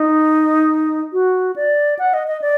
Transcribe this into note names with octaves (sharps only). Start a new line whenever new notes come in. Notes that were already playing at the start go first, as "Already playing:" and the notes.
Already playing: D#4
F#4
D5
F#5
D#5
D#5
D5